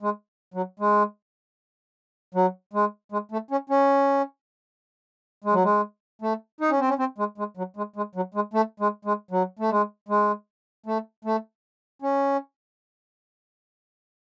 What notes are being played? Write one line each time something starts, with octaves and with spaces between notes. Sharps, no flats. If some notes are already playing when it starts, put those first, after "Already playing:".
G#3
F#3
G#3
F#3
G#3
G#3
A3
C#4
C#4
G#3
F#3
G#3
A3
D#4
C#4
C4
C#4
C4
G#3
G#3
F#3
G#3
G#3
F#3
G#3
A3
G#3
G#3
F#3
A3
G#3
G#3
A3
A3
C#4